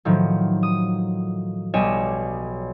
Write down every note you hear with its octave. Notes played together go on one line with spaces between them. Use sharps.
A2 D#3 F3 F#3
D#6
B1 G3 C#5 D#5 G#5 E7